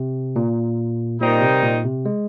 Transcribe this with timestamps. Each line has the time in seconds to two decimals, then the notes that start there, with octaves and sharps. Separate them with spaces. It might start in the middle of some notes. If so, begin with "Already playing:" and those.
Already playing: C3
0.36 A#2
1.21 A#2 D#3 G3 C4 D#4
1.41 C3
1.63 A#2
1.84 C3
2.05 G#3